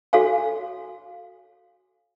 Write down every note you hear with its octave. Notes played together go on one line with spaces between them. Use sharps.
F#4 A4 C#5 F5 G#5